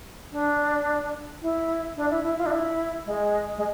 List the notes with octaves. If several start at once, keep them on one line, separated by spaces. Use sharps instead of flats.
D4
E4
D4
E4
E4
F4
D4
E4
G#3
G#3